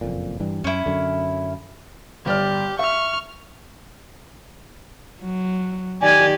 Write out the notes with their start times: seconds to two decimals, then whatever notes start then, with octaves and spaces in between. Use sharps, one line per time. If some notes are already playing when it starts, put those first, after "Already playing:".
0.01 F#1 F2 A#2
0.40 G2 E3 G3
0.64 F#2 C#4 E4
0.86 F#2 D3
2.26 G1 G4 D5 F6
2.79 E5 C#6 F6
5.21 F#3
6.01 D#3 G4 D5 G#5